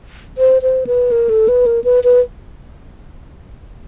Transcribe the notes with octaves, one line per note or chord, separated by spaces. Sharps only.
C5
C5
B4
A#4
A4
B4
A#4
B4
B4